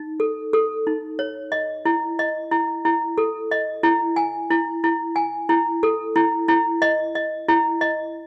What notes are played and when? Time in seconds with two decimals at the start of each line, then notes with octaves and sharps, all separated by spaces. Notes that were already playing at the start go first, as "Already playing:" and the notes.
Already playing: D#4
0.20 A4
0.53 A4
0.87 D#4
1.19 C#5
1.52 D#5
1.85 E4
2.19 D#5
2.51 E4
2.85 E4
3.18 A4
3.51 D#5
3.83 E4
4.16 G#5
4.51 E4
4.84 E4
5.16 G#5
5.49 E4
5.83 A4
6.16 E4
6.48 E4
6.82 D#5
7.15 D#5
7.48 E4
7.81 D#5